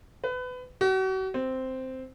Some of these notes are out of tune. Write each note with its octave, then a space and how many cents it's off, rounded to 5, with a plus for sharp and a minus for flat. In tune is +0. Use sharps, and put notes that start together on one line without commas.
B4 +25
F#4 +40
C4 -5